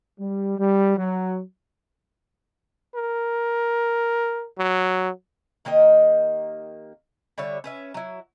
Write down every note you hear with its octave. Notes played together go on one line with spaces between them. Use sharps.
G3
G3
F#3
A#4
F#3
D#3 A#3 G4 D#5
D3 G3 C#5 E5
C#4 B4 E5
F#3 E4